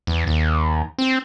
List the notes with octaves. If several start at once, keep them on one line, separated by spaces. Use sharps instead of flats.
E2
D#2
C4